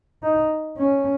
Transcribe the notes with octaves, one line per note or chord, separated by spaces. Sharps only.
D#4
C#4